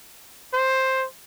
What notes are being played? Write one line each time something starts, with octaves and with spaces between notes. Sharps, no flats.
C5